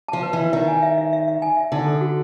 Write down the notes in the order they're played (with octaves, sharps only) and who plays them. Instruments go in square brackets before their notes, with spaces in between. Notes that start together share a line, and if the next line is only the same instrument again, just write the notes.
[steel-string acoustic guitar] F3 [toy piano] A5
[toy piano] B4
[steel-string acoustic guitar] E3 [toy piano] B4
[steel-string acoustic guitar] D#3 [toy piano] E5
[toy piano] G#5
E5
E5
E5
E5
G#5
E5
[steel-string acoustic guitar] D3 [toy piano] D#4
[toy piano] A4
F#4